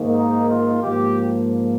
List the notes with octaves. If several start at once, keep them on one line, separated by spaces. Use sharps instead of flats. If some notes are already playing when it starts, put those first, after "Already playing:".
Already playing: G#2 D#3 A#3
D#4
F4
G#2 F3 A#3 G4